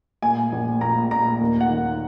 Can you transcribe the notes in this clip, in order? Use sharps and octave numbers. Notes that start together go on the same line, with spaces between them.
A#2 G#5
A#1
A#2 A#5
A#2 A#5
D#2
F#5
D#3